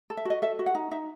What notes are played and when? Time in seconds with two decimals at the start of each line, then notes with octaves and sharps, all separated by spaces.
0.10 A4
0.17 E5
0.25 F#4 D#5
0.42 A4 E5
0.59 F#4
0.66 F#5
0.75 D#4
0.91 D#4 E5